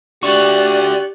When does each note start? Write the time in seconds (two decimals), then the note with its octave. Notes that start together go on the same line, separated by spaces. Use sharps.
0.23 D4 F#4 G4 D5 C#6 F#6